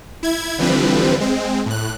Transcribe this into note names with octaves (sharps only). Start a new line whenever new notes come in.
E4 G#6
D3 E3 F3 G3 C4 B4
G#3 C4
A2 F#6